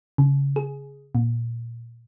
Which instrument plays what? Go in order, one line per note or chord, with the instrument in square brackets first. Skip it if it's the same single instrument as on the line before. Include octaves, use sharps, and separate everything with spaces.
[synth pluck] C#3
G#4
A#2